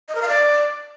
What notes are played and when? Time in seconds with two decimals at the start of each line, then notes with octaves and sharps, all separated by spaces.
0.08 D#5
0.15 A#4
0.22 F5
0.28 D5